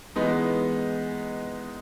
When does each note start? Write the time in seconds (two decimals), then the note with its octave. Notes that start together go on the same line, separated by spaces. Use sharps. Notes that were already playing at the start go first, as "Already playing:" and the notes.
0.16 E3 G#3 B3 D#4